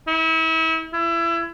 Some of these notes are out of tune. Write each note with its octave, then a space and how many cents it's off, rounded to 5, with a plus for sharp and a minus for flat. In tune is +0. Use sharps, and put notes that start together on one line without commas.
E4 -35
E4 +30